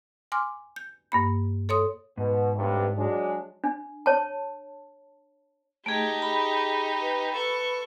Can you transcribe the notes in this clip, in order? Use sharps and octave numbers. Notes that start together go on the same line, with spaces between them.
G#5 C6 D6 F6
G6
G2 A#3 B5
A4 C#5 C6 D#6
G#2 B2
B1 G2 C3
F#3 G#3 D4
D4
C#5 A5
A3 D#4 G4 G#4 A5
G#4 B5
B4
A4 B4 C#6